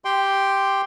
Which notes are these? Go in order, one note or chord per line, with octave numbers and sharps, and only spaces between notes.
G4 G5 C6